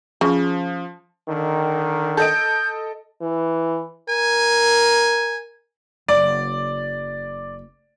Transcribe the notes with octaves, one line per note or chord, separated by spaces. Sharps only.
C#3 F3
D3 D#3
A4 D#5 G6 D7
E3
A#4 G#5
F#1 D5